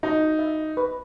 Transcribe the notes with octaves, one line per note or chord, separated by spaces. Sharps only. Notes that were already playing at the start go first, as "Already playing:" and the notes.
D#4 F#4
E5
B4